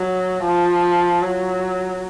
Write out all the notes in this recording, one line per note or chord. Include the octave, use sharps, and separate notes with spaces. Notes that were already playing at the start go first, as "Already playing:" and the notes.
Already playing: F#3
F3
F#3